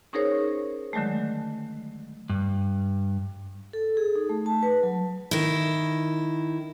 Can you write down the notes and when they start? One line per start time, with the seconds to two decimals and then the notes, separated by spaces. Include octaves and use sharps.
0.13 C#4 D#4 G#4 A#4 C5 C#5
0.93 D3 D#3 F#3 G#3 A3
2.30 G2
3.73 A4
3.97 G#4
4.16 D#4
4.29 A3
4.46 A5
4.63 B4
4.83 F#3
5.31 D#3 E4